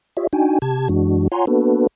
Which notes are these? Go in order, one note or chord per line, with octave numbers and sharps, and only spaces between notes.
F4 G4 C#5 D#5 E5
D4 D#4 F#4 G5 G#5
C3 G4 A5 G#6
F#2 E3 G#3 D4 F#4
F4 C#5 F#5 G#5 A#5 C6
A#3 B3 D4 F#4 A4 B4